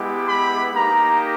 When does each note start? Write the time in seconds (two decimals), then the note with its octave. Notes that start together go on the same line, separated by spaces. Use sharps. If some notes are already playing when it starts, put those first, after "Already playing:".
Already playing: G#3 B3 E4 G4
0.28 B5
0.74 A#3 D#4 G4 A#5